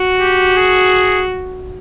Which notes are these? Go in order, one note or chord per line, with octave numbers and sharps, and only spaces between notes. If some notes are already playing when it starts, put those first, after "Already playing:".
Already playing: F#4
G4
G#4